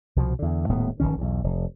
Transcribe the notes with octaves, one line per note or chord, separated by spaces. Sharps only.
C2 B2 F3
E2 D3
D#1 A2 B3
F1 D#2 D#3 C#4
B1 E2
F1